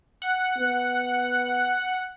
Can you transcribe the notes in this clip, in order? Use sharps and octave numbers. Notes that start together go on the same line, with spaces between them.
F#5
B3